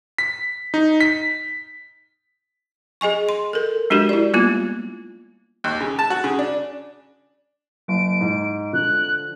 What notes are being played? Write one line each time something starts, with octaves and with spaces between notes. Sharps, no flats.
B6
D#4
B6
G#4 D#5 G#5 C#6
C6
A4 A#4
G#3 D4 F#4 G4 A#4
E4 D5
G3 A#3 B3 F4
D#2
C#3
A5
F#4
C#3
D4
F#1 D7
G#2
D3 F3 F#6